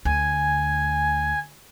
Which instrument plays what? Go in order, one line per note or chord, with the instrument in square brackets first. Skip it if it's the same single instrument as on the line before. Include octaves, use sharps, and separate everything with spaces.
[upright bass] D2 [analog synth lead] G#5